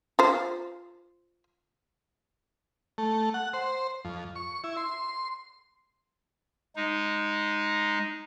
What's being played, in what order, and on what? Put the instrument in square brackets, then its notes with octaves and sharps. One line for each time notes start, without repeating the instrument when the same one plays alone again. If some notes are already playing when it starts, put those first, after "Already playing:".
[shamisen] F4 C5
[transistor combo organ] A3
F#5
C5
F2
C#6
E4
C6
[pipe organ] G#3 D#4